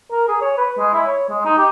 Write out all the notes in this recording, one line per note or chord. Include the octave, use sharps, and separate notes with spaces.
A#4
G#4
C#5
B4
G#3
E4
C#5
G#3
D#4
G4